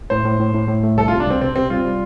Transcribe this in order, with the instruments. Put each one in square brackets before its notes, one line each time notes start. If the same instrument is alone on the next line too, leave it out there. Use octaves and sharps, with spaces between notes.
[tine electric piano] A2 [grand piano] C5
[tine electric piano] A2
A2
A2
A2
A3
[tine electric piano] C2 [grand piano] A4
[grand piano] F4
[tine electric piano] C3
[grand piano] D4
[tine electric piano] C2 [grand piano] C4
[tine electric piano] C3 [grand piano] C4
[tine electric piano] C3 [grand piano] C4
[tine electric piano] G3 [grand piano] F4
[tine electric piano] G3